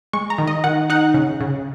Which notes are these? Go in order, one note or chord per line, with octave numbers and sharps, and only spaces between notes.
G#3 C#6
A#5
D#3
D#5
D#3 F#5
D#4 F#5
C#3
C#3